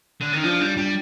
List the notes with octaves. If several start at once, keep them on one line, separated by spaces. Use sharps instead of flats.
D3
D#3 D#4
F3 D4 F4
G3 D4 F4
G3 D4 F4